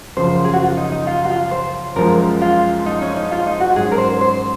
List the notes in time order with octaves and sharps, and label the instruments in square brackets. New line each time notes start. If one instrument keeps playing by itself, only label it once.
[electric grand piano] F#2 C#3 F3 [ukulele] C5
[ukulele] G#4
F#4
F4
D#4
D#4
F4
F#4
F4
C5
[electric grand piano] F#2 F3 G#3 [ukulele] A#4
[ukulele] F4
D#4
C#4
D#4
F4
D#4
F#4
[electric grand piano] G#2 F#3 C#4 [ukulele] G#4
[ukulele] A#4
C5
C5